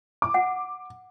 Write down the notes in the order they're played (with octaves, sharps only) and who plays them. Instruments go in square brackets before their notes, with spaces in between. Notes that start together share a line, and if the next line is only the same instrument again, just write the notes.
[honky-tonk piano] D6
[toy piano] F#5